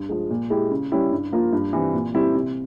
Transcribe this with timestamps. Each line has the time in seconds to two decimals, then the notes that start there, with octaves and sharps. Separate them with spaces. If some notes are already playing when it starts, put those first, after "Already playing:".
Already playing: G2
0.09 F3 G#3
0.30 A#2
0.50 G#3 E4 G4
0.71 C#3
0.92 G3 C#4 E4 G4
1.12 G2
1.32 F3 A#3 F4
1.53 G2
1.73 E3 G3 C4
1.94 A#2
2.14 G3 C4 E4 G4
2.35 C3